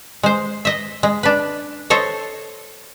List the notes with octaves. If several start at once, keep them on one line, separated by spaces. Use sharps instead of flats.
G#3 C5
D#5 E5
G#3
D4 B4
A4 C5 C#5 D#5